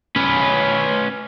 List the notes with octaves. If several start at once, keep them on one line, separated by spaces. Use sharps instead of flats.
C#4 B4